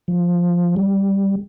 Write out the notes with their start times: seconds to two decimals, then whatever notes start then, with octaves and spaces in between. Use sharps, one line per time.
0.08 F3
0.76 G3